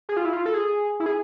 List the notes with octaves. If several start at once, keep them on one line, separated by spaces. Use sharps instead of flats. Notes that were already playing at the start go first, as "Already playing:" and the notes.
G#4
F4
E4
F4
A4
G#4
E4
G#4